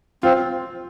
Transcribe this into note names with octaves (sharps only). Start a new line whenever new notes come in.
C4 F4